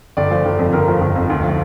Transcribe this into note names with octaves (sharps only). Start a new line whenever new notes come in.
G1 D5
F3
G1
F2
G1 A#4
F3
G1
F2
D2
F3